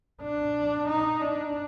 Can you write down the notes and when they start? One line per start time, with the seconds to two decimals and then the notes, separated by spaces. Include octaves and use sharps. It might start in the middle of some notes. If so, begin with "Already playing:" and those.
0.21 D4
0.88 D#4
1.21 D4